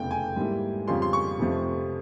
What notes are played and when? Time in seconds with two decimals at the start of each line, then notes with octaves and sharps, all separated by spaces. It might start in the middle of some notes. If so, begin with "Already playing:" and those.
Already playing: F1 E2 C#3 G5
0.11 G#5
0.36 G#2 G3 A#3 E4
0.87 F2 C#3 G3 C#4 F4 C6
1.02 C6
1.13 C#6
1.39 F1 F2 C3 F3